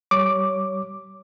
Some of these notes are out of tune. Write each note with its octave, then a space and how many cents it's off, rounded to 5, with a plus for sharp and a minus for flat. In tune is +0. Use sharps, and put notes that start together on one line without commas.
G3 -30 C#5 +5 D6 +0